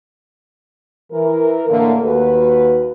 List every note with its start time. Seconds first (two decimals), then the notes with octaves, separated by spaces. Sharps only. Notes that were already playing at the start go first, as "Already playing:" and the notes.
1.12 E3 A#4
1.69 A2 D3 A3 A#3
2.04 D#2 F#4 B4